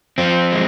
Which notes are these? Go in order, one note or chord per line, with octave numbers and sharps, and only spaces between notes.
F3 C4
G#3